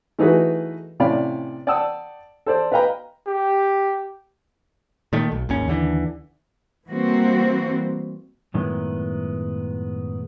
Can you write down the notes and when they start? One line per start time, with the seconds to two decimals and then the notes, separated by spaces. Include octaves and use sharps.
0.19 E3 A3 D#4 F#4 G#4 B4
1.00 A2 C3 C#4 D5 F5 B5
1.67 D5 F#5 G5 A5 D#6 E6
2.46 A4 C5 D5
2.72 B4 D#5 F5 G5 A#5 B5
3.27 G4
5.13 A#2 D#3 A3
5.32 B1
5.49 G#1 D#2 C#4
5.68 D#2 D3 E3
6.88 E3 G3 A#3 C4 F#4
8.54 F#2 A2 D#3 G#3 B3